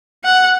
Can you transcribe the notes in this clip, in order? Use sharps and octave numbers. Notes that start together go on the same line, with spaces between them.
F#5